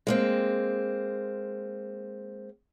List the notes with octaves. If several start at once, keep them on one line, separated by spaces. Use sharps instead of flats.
G#3 A#3 C4